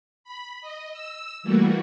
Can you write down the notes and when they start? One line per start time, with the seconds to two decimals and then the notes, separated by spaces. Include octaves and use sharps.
0.24 B5
0.61 D#5
0.93 E6
1.43 E3 G3 A3 A#3 F#4